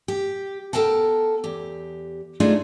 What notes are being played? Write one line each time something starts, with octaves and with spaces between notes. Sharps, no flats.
G4
B3 A4 A#4 G5 A5
E2 G4
G#3 A3 D4 D#4 F4 G#4